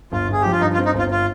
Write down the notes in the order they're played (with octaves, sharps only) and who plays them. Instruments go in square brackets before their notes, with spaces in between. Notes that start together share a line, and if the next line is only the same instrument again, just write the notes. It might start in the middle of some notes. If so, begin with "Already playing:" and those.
[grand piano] G1 [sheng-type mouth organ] F4
[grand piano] G2 [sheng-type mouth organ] G#4
[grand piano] F3 [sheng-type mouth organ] G4
[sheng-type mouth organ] F4
[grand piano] G2 [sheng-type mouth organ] D#4
[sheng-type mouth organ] F4
[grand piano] C4
[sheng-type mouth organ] D#4
[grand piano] G1 [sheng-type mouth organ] F4
[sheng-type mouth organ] F4